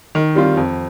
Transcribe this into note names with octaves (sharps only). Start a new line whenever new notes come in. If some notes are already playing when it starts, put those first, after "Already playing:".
D#3
G3 C4 F4
F2